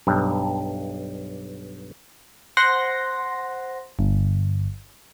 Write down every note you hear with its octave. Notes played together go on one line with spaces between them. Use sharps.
B1 G2
C5 F#5 C6 A#6
G1